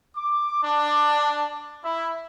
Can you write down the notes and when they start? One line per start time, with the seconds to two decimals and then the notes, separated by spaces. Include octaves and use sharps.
0.15 D6
0.63 D4
1.83 E4